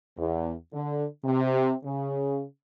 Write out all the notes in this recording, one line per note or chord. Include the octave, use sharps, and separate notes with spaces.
E2
D3
C3
C#3